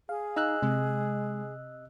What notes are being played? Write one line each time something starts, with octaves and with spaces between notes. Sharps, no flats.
G#4 F5
D#4 D#5 E6 F#6
C3 G#3